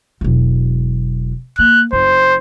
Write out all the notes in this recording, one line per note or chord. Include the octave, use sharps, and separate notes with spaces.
E1 F#3
A#3 F#6
F#1 C5